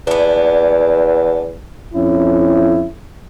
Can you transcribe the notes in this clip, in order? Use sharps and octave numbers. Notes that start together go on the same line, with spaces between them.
E2 B3 D4
F2 C#4 E4